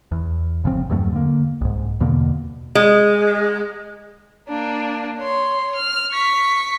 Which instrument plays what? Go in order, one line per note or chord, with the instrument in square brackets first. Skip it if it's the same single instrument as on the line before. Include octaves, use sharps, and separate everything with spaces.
[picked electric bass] E2
G1 C#3 F3 C4
E2 G2 F#3 A3
D3 A#3
C2 G#2
E2 B2 D3 A#3
[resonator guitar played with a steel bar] G#3
[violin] A#3 D4
C#5 C6
F6
C#6 B6